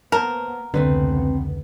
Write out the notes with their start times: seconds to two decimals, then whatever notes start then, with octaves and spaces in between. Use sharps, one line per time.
0.12 A#3 B3 A#4 C5 A5
0.74 F1 C#2 D3 A3 B3 C4 B4